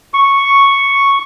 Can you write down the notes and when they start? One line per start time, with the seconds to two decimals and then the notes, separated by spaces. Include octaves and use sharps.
0.14 C#6